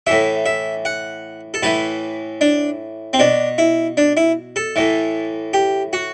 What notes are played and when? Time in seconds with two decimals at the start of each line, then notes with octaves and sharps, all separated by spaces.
0.07 A2 E3 E5
0.46 E5
0.85 F#5
1.54 A4
1.63 A2 E3 B4
2.41 D4
3.13 C4
3.19 B2 D4
3.58 E4
3.97 D4
4.17 E4
4.56 A4
4.76 A2 E3
5.54 G4
5.93 F#4